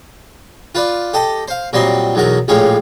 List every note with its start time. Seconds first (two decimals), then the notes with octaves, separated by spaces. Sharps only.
0.75 F4 B4 D5
1.14 G4 A4 D#5 A5
1.48 C5 F5
1.73 A#2 F#3 G3 C4 D#5 C6
2.15 B1 E2 F#3 A#4 F#5
2.48 A#1 A2 G#3 G4 C#5 F5